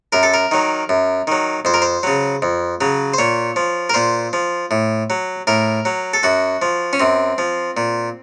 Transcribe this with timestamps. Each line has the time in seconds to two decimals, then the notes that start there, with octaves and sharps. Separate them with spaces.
0.12 F#2 A#4
0.23 A4
0.34 A#4
0.51 D#3 F#3
0.89 F#2
1.27 D#3 F#3
1.65 F2 C5
1.74 A#4
1.82 C5
2.03 C#3 F#3
2.42 F2
2.81 C#3 F#3
3.14 C5
3.18 A#2 C#5
3.56 F3
3.89 A#4
3.94 A#2 C5
4.33 F3
4.71 A2
5.10 F#3
5.47 A2 A#4
5.85 F#3
6.14 A4
6.23 F#2 F#4
6.62 F3
6.93 C#4
7.00 F#2 C4
7.38 F3
7.77 A#2